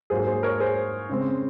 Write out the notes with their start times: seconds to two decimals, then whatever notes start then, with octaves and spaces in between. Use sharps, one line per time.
0.10 G#2 F#3 A#3 G#4 C5
0.27 G#4 C5
0.43 A#4 C#5
0.60 G#4 C5
1.10 C#3 G#3 C4